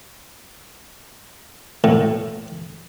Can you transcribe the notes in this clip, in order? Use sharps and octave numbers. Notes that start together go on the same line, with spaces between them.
A2